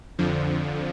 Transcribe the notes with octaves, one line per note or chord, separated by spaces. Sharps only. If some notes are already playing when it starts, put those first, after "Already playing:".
F2 D3 F3